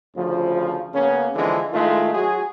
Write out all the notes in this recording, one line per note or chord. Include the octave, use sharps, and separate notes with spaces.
D2 C#3 F3
C#3 A#3 B3 C#4
D3 E3 F3 G#3
A2 D#3 G#3 A3 F4
F#3 F#4 G#4